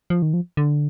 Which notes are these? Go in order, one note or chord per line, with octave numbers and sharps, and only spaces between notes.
F3
D#3
F3
D3